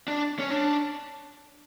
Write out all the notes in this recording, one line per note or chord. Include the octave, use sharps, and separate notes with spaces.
D4
C#4
D4